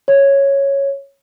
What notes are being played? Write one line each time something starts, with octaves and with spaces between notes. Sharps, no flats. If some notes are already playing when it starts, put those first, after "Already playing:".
C#5